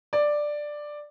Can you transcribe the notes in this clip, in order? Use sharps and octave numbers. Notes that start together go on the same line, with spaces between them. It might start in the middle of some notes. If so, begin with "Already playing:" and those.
D5